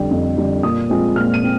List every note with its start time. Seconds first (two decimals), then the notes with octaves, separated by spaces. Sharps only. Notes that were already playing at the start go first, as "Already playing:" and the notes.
Already playing: F2 D3 G3 D4 G5
0.11 F2
0.37 D3 G3 D4
0.63 A#2 D#6
0.89 F3 G#3 C4
1.16 A#2 F6
1.34 D#7
1.43 C4